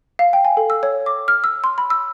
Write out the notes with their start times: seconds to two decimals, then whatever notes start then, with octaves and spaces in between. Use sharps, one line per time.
0.19 F5
0.33 G5
0.45 G#5
0.57 A4
0.70 E6
0.83 C#5
1.06 D6
1.28 F6
1.44 E6
1.64 C6
1.78 B5
1.90 E6